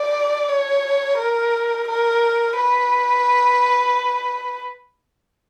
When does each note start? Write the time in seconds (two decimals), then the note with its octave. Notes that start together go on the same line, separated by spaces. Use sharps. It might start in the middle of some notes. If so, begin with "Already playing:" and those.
Already playing: D5
0.48 C#5
1.18 A#4
1.88 A#4
2.57 B4